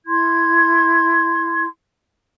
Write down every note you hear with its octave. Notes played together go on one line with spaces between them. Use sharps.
E4 C6 G#6